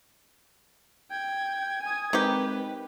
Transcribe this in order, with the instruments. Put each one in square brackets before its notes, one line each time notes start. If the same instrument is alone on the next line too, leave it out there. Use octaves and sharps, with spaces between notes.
[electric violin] G5 [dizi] G#6
[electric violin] G#5 D#6
[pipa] D#3 G4 [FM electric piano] G#3 C4 G5 [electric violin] B4